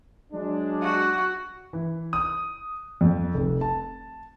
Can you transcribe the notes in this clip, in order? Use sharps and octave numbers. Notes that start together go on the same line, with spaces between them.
F#3 G#3 D4
F#4
E3
D#6
F2
F1
A5